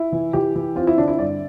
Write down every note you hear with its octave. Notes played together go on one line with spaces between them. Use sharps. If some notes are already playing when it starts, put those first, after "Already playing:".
Already playing: E4
E3
E3 G4
E3
C4 F4
E4
D3 D4
E4
G2 D5